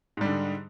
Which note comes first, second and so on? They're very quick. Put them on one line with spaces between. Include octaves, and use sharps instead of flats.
G#2 G3 D3